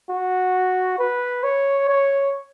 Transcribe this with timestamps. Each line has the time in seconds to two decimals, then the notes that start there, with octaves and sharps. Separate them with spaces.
0.09 F#4
0.99 B4
1.43 C#5
1.89 C#5